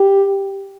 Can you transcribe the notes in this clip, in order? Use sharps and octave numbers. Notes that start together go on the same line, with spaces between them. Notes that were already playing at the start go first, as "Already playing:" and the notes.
Already playing: G4